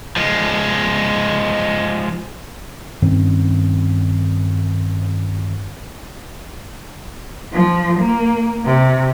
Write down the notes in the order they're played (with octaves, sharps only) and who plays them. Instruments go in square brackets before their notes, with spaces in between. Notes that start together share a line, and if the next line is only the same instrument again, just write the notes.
[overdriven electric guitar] F3 G#3
[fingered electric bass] G2 D#3 C4 C#4
[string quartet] F3
A#3
C3